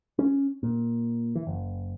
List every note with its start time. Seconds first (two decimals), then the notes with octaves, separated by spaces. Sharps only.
0.19 C#4
0.63 A#2
1.35 E3
1.47 F#1